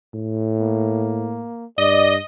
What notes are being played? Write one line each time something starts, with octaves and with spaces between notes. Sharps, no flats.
A2
A#3
G2 D5 D#5